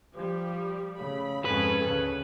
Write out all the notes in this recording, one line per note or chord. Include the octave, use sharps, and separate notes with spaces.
F3 G3 G4
C#3 A3 B5
F2 G#2 C#4 A4 B4
D2 C#3